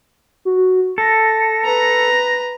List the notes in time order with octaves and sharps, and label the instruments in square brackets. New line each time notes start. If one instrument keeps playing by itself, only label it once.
[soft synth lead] F#4
[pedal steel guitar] A4 [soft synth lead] A#6
[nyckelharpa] B4 A#5